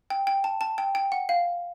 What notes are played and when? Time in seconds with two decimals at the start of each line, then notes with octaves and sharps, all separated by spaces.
0.10 G5
0.27 G5
0.44 A5
0.61 A5
0.78 G5
0.95 G5
1.12 F#5
1.29 F5